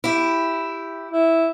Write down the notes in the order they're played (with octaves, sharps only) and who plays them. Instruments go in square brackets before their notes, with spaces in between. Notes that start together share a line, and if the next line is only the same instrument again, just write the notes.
[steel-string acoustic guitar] E4 G4
[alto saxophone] E4